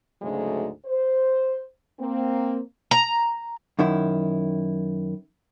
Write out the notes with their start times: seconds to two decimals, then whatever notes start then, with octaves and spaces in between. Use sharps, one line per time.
0.22 D2 G#2 C#3 F#3 G#3 A3
0.86 C5
2.00 A#3 C4
2.91 A#5
3.79 F#2 D#3 E4